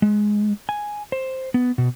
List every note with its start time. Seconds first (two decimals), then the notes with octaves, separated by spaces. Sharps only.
0.02 G#3
0.69 G#5
1.12 C5
1.54 B3
1.78 B2